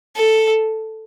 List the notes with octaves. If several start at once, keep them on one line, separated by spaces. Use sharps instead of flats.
A4